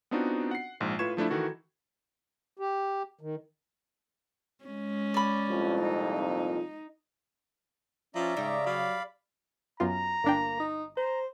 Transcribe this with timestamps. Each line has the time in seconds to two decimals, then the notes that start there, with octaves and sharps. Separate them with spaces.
0.11 B3 C4 D4 D#4 F4 F#4
0.51 F#5 C7
0.80 A#1 G#2
0.99 A2 F4 B4 C#6 G#6 E7
1.17 F3 A3 D4 E4
1.30 D#3 E3 F#4 A4
2.59 G4
3.21 D#3
4.65 G#3 C#4
5.14 D5 B5
5.48 C2 F2 A#2
5.82 D#4
8.15 F3 C#4 D5 E5 A#5
8.37 G#2 C#3 G3
8.66 F#3 D5 F5 B5
9.80 F#2 B3 F4 A#5
10.24 G1 A#3 D4 G5
10.60 D#4
10.97 C5 A#5